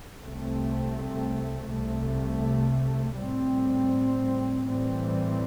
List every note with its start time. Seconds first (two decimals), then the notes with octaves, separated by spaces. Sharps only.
0.22 C2 C3 A3 C4
1.69 C2 C3 A3
3.17 A2 G3 C4
4.64 A2 E3 G3 C4